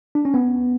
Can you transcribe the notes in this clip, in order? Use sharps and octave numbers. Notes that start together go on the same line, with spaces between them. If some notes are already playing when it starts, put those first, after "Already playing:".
D4
C#4
B3